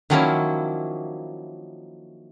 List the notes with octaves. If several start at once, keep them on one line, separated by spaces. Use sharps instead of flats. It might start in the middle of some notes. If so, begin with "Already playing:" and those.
D#3 F3 F#3 A#3 C#4 E4